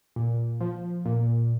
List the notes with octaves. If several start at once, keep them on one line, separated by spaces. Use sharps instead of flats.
A#2
F3
A#2